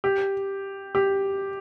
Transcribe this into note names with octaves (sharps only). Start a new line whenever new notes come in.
G4
G4